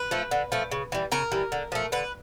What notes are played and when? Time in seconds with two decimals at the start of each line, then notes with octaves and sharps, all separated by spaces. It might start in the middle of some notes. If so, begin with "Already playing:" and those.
Already playing: B4
0.11 F3 A3
0.31 D3
0.52 F3 A3
0.72 C#3
0.92 E3 G3
1.12 C#3 A#4
1.32 E3 G3
1.52 D3
1.72 F3 A3
1.92 D3 B4